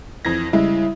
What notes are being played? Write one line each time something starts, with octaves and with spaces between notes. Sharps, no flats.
F2 E3 G#6 A#6
C#3 G3 G#3 E4 E5